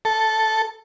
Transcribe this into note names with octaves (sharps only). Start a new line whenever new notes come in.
A4